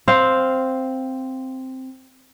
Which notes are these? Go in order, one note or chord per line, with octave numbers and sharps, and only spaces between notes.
C4 F5